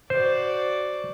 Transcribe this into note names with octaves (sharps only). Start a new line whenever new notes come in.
F#4 C5 D5